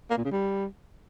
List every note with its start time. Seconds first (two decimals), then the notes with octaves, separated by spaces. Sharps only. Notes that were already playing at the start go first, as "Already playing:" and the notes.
0.11 A#3
0.18 A#2
0.25 C#3
0.32 G3